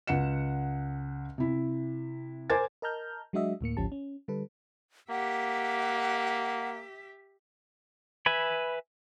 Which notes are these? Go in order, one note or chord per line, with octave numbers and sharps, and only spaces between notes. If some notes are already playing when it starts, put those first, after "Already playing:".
C#2 F#5 C#7 E7
C3 E4
A#4 C5 G#5 D6 G#6 A6
A#4 D#5 A5 A#5 F6 G6
F#3 G#3 D4 F#4 D#5 E5
D2 A2 A#3 C#7
G#1 D2 F3 C#4 G4 A5
C#4
D3 G3 A4 B4
A#3 G4 E5 F#5
B4 E5 G#5 B5